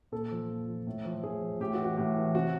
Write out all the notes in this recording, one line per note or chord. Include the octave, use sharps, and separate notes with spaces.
A#2 A4
F3
A#2
F3
A2
F3
A2 G#4
F3
A2 G4
F#4
E3
F#4
A2 G4
E3
C3 F#4